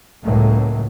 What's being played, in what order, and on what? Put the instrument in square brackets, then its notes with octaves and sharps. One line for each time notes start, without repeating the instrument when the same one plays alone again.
[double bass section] C#2 A2 C#3 F#3 A3 A#3